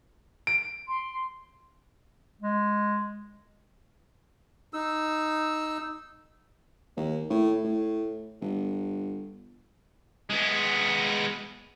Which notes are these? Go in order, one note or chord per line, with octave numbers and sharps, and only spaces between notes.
D7
C6
G#3
D#4 E6
D#2
A2
A2
G1
G#3 B3